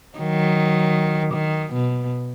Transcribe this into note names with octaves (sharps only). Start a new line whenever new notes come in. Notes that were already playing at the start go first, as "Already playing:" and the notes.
D#3 F#3
D#3
B2